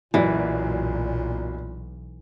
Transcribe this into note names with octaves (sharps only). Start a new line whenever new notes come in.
F#1 B1 A#2 E3 F#3 D5